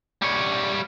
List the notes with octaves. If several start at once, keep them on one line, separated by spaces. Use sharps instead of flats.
G3 C#5